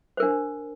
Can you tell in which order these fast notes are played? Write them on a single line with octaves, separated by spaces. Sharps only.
C5 A#4 D4